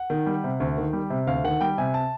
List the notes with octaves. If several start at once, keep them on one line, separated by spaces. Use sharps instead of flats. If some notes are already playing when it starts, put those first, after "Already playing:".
Already playing: F#5
D#3
G3
C3
D2
D#3
G3
C3
D2 F5
D#3 F#5
G3 G5
C3 G#5
A5